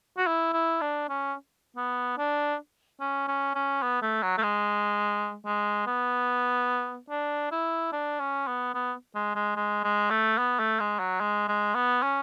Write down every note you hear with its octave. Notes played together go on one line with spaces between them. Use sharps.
F#4
E4
E4
D4
C#4
B3
D4
C#4
C#4
C#4
B3
A3
F#3
A3
G#3
G#3
B3
D4
E4
D4
C#4
B3
B3
G#3
G#3
G#3
G#3
A3
B3
A3
G#3
F#3
G#3
G#3
B3
C#4